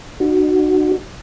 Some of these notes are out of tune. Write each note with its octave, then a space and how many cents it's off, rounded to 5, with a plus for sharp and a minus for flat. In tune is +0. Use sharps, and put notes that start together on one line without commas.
D#4 -45 F#4 +0